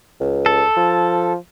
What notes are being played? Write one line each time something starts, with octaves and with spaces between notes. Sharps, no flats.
C#2
A4
F3